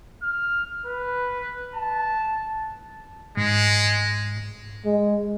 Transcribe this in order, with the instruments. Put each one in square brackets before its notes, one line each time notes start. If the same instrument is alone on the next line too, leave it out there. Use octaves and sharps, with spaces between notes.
[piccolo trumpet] F6
B4
A5
[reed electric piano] G#2 [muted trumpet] G#3
[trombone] G#3